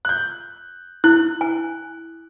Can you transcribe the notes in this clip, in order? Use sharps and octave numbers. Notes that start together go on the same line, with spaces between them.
F#6 G6
E4 F#6
G#5